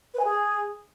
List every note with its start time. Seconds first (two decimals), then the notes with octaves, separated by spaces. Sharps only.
0.14 B4
0.19 G#5
0.25 G#4